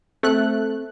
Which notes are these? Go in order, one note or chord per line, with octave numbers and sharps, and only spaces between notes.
A3 C4 F#6